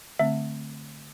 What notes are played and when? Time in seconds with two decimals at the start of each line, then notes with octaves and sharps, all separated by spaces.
0.19 D3 A3 C4 E5